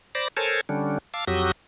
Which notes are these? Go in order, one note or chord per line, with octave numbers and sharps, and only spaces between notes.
C5 D5 B5 D6 A#6
A4 A#4 C5 C#5 G#5 A5
D3 G3 C#4 D4
F5 A5 D6 E6
F2 F#3 F#4 G4 D#6 E6